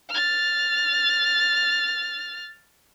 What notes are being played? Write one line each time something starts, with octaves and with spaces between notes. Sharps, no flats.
F6 A6